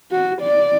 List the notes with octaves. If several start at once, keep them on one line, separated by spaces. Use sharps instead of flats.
F#4
D5